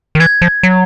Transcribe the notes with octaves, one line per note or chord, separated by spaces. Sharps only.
D#3
E3 G#6
F3
F#3